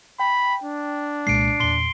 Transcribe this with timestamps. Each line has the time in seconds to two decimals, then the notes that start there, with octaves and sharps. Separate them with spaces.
0.20 G5 B5
0.64 D4
1.27 C2 A#2 G#3 C7 D7
1.60 E2 A#2 C6 C7 G7